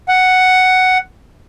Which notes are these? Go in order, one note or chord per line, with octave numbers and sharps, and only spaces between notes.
F#5